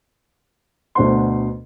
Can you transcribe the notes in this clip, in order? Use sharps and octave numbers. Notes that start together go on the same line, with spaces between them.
D2 B2 D4 C5 F#5 C6